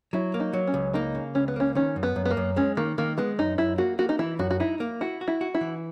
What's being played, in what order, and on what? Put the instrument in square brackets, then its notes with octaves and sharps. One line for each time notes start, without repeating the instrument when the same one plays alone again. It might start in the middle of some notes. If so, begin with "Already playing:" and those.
[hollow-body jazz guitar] F#3 [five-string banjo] E4
[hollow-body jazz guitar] A#3
[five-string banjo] D#4
[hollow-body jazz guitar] F#3
[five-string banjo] C#4
[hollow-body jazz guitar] C#2
[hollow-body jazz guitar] A#3 [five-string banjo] D#4
[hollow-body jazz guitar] C#3
[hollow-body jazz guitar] C#2 [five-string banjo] C#4
[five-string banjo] B3
[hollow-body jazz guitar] A#3 [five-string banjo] C#4
[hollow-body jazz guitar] D#3 [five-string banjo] C#4
[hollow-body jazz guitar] F#2
[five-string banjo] B3
[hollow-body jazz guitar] F#2
[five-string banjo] B3
A#3
[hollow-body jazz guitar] F#2
[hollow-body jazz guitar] G#3 [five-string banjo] C#4
[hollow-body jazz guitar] D#3 [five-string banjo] A#3
[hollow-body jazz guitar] D#3 [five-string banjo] A#3
[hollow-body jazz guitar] G#3 [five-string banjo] B3
[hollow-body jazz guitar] F#2 [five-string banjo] D#4
[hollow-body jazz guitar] F#2 [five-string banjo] E4
[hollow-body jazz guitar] A#3 [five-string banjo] F#4
[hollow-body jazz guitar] A#3 [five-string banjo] F#4
[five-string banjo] D#4
[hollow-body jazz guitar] E3 [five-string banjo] E4
[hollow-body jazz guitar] F#2 [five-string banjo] F#4
[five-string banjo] F#4
[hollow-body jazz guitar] D#4 [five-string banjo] E4
[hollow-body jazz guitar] A#3
[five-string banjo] E4 [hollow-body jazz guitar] F#4
[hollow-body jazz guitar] F#4
[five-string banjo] E4
[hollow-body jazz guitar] F#4
[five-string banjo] E4
[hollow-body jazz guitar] E3